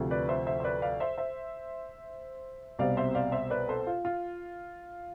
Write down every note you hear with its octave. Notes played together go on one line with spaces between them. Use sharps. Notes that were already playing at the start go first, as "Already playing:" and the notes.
Already playing: D2 C3 F3
B4 D5
C5 E5
C5 E5
C5
B4 D5
D5 F5
C5 E5
C5 E5
C2 B2 G3 C4 D5 F5
C5 E5
D5 F5
C5 E5
B4 D5
A4 C5
F4
F4